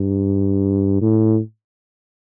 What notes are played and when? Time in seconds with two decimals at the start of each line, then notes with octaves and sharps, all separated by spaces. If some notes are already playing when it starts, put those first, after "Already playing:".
Already playing: G2
1.02 A2